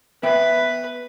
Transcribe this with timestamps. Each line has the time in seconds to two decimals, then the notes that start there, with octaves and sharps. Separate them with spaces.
0.23 B3 B4 E5 G5